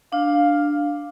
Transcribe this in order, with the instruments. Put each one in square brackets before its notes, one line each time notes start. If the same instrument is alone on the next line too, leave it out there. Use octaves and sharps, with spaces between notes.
[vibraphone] D4 [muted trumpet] F5